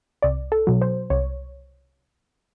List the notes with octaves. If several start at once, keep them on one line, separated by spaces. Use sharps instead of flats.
C2 D5
A4
B2 F#3
C5
C2 C#5